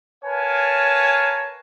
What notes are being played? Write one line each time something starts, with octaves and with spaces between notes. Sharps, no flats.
A#4 B4 C#5 F5 G#5 A5